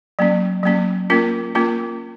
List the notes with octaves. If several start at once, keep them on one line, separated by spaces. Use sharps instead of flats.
F#3 A#3 C#4
F#3 A#3 C#4
A#3 C#4 F4 A#4
A#3 C#4 F4 A#4